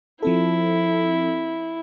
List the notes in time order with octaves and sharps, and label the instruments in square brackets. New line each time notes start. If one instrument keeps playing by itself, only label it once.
[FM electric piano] F3 C4 A4 [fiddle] E4